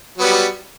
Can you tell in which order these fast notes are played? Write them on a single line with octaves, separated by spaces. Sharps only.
F#3 B3 G3